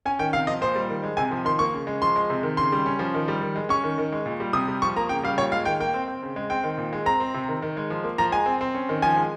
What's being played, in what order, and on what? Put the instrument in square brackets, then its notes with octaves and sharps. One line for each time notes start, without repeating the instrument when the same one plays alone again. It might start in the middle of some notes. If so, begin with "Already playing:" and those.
[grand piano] C#4 G#5
D#3 G5
C3 F5
F3 D#5
A#2 C5
G3
D#3
G#3
C3 G#5
F3
D#3 C6
A#3 C#6
C#3
G#3
F3 C6
G#3
C3
D#3
C#3 C6
G3
C#4
F3
D#3
G3
D#3
G#3
C#4 C#6
D#3
D#3
G#3
A#2
G3
C3 D#6
G3
F3 C#6
A#3 A#5
C#3 G5
G3 F5
A#2 C#5
G#3 F5
D#3 G5
A#3 G5
C4
C4
C#3
G#3
C4 G5
D#3
A#2
G#3
C4 A#5
C4
C3
D#3
D#3
G#3
F3
A#3
F3 A#5
G#3 G#5
C4
C4
C#4
D#3
F3 G#5
G#3